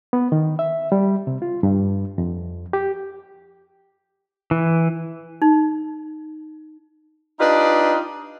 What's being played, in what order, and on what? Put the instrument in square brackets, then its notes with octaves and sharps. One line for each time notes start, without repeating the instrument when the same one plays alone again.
[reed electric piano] B3
D#3
E5
G3
C3
F4
G2
F2
G4
[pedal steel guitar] E3
[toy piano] D#4
[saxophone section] D4 D#4 F4 G4 B4 D#5